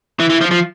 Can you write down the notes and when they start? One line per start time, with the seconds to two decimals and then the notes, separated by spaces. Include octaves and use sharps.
0.19 E3 E4
0.30 E3
0.41 F3
0.51 F3